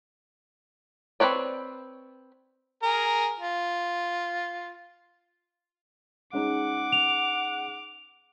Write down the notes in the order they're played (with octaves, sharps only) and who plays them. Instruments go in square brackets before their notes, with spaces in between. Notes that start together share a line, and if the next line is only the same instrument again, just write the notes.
[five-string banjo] C4 F4 B4 C#5 D5
[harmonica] G#4 A#4
F4
[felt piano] G#3 C#4 D#4 [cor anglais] F#5 [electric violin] D6
[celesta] F7